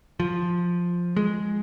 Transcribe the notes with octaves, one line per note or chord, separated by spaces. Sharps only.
F3
G#3